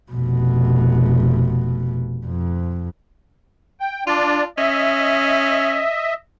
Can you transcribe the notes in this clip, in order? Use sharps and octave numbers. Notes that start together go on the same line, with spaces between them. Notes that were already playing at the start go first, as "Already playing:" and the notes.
F1 B2
F2
G5
D4 F4 D5
C#4 D#5 E5